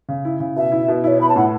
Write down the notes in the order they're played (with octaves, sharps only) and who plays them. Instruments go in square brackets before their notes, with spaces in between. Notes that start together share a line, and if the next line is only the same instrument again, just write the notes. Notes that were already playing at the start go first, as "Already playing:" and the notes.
[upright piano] C#3
E4
C#3
[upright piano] B2 [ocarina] E5
[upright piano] E4
B2
[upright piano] E4 [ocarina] C#5 E5
[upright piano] B3 [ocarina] B5
[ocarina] A5
[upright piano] A2 [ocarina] F#5